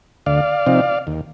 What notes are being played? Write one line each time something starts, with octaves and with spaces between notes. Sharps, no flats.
D2 D5 F5
C3 F3 C4 D#4
D#2